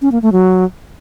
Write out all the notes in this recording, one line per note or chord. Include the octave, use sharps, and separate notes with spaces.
C#4
A#3
A3
F#3